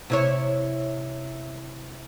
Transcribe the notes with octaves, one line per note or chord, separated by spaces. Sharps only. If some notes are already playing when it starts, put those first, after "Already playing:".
C3 E4 C#5